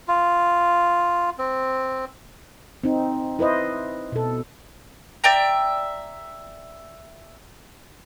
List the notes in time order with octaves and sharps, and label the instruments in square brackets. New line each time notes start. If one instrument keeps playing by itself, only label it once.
[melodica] F4
C4
[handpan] C4 D#4
E4 B4 C5 D#5
B2 A4
[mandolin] D5 E5 G5 A#5